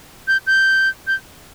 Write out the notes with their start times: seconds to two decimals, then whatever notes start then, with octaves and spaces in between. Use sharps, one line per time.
0.28 G6
0.47 G6
1.07 G6